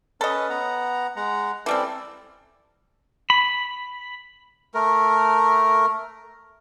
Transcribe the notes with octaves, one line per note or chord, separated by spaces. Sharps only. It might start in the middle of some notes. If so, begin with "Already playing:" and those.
C#4 A4 B4 D#5
B3 F#5 A#5
G#3 F#5 A#5
E3 G3 C4 E4 A4 D5
B5
A3 A#4